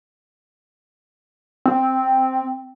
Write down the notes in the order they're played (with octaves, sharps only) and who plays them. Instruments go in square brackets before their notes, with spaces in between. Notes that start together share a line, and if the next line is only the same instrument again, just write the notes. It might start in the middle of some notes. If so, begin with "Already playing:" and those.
[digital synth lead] C4